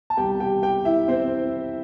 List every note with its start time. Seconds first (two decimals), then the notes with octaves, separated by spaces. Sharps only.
0.10 A5
0.17 C2 B2 G3 G4 G5
0.40 G4 G5
0.62 G4 G5
0.85 E4 E5
1.08 C4 C5